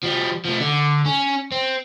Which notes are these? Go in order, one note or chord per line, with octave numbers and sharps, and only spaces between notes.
F3 G3
F3 A3
D3
C#4
C4